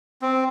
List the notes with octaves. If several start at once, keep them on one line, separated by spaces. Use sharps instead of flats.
C4